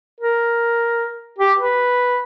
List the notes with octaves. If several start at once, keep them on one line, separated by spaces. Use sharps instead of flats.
A#4
G4
B4